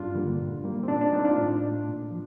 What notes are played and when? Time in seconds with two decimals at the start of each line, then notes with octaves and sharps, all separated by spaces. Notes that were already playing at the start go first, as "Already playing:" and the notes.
Already playing: G2 D4 F4
0.15 D3 G3 A#3
0.39 A#2
0.64 G3 A#3
0.83 C4
0.88 A#2 D4
1.01 D4
1.13 A3 C4 D#4
1.25 D4 F4
1.38 A2
1.62 A3
1.87 A#2
2.11 F3